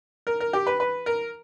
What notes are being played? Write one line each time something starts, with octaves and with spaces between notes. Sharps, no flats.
A#4
A#4
G4
B4
B4
A#4